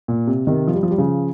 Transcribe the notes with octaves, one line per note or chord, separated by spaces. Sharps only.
A#2
C3
C3 D#3
F3
G3
F3
G3
C#3 F3